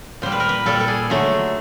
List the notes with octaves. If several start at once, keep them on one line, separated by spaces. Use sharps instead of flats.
A#2 G3 C5
B4
A#4
B4
A#2 G3 A4
A4
G#4
D3 F#3 A3